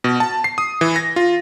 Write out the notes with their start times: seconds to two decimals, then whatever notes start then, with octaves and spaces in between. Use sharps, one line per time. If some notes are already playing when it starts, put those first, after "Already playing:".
0.04 B2
0.20 A5
0.44 C7
0.58 D#6
0.81 E3
0.96 A#6
1.16 F4